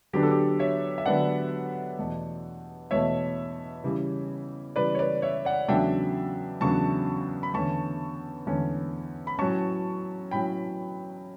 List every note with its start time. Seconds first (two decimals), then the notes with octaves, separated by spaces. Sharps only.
0.13 D3 F#3 B3 D4 G4
0.23 A4
0.31 G4
0.59 C#5 E5
0.98 E5
1.06 D3 F#3 B3 D4 D5 F#5
1.99 E2 B2 A3
2.91 E2 B2 A3 C#5 E5
3.84 C#3 E3 G3
4.76 C#3 E3 G3 B4 D5
4.95 C#5
4.99 B4 D5
5.22 C#5 E5
5.45 D5 F#5
5.68 E2 C#3 F#3 A3 D4 E5 G5
6.61 E2 C#3 F#3 A3 D4 A5 C#6
7.43 B5
7.54 E2 D3 A3 C#4 A5 C#6
8.46 E2 D3 A3 C#4
9.27 B5
9.39 A2 F#3 C#4 A5 C#6
10.31 A2 F#3 C#4 G5 B5